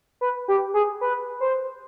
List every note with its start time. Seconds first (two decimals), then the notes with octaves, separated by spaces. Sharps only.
0.21 B4
0.48 G4
0.74 G#4
1.01 B4
1.41 C5